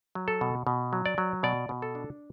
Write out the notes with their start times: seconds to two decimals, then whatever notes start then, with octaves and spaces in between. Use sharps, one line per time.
0.15 F#3
0.28 A4
0.41 B2
0.67 B2
0.93 F#3
1.06 D5
1.18 F#3
1.43 B2 D5
1.69 B2
1.82 A4
1.95 D4